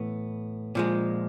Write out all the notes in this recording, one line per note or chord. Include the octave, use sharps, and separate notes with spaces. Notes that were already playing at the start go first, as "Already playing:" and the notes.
Already playing: A2 E3 B3
A#2 F3 G#3